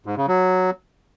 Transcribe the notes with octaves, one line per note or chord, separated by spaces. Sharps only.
G#2
C#3
F#3